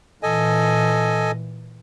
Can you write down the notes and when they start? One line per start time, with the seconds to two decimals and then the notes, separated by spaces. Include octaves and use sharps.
0.23 A#2 E3 A4 D#5 G#5